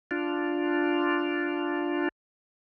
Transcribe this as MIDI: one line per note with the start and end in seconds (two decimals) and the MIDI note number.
0.11 2.09 62
0.11 2.09 65